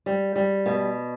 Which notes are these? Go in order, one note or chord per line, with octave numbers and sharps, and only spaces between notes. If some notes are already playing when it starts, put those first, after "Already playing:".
G3
G3
B2